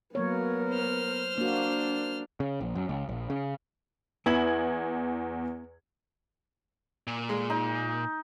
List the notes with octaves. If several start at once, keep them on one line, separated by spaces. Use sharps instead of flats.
F#3 A#3 B3 A#4 C#5
C5 F6
A#3 D4 F#4
C#3
A#1
F#2
C#2
A#1
C#3
E2 B3 E4 G#6 F#7
A#2
G#3
D#4